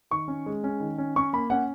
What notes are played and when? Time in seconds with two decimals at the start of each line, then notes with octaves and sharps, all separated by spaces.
0.11 D#3 C#6
0.28 C#4
0.46 G#3
0.64 C#4
0.80 D#3
0.98 C#4
1.16 C#4 C#6
1.33 A#3 B5
1.50 C#4 F#5